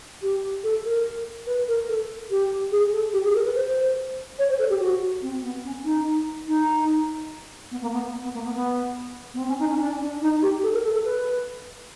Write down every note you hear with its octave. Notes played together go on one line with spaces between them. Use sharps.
G4
A4
A#4
B4
A#4
A4
G4
G#4
A4
G4
G#4
A#4
B4
C5
C#5
C5
A4
G4
F#4
C4
B3
C#4
D#4
D#4
B3
A#3
B3
B3
B3
A#3
B3
B3
B3
C4
C#4
D#4
C#4
D4
D4
D#4
G4
A4
A#4
A4
A4
B4